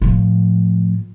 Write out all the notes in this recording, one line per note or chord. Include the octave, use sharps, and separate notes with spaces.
A2 F3